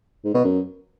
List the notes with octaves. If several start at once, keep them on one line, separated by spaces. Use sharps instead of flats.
G#2
B2
F#2